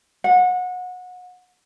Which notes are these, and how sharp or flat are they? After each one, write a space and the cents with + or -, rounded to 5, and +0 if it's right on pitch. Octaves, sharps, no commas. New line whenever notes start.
F#5 -25